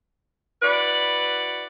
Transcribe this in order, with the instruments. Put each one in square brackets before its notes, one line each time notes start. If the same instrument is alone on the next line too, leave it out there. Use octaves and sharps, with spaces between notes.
[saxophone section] E4 F#4 B4 D5